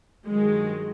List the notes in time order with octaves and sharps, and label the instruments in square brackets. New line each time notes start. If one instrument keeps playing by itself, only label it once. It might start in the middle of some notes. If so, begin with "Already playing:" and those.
[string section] G2 D#3 F#3 G#3